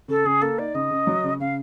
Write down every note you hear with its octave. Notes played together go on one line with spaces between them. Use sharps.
C#3 A4
C#3 G#4
A#3 A4
D#4 D5
C#3 D#5
C#3
F#3
C#3
C#3 F5